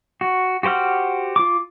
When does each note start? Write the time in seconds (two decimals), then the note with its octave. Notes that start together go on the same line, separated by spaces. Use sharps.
0.21 F#4
0.63 F#4 G4 C5 F#5 F6
1.36 F4 D6